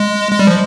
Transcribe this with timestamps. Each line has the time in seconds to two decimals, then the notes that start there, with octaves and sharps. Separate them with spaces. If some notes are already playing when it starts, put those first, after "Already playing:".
Already playing: G#3
0.32 G#3
0.39 G3
0.47 F3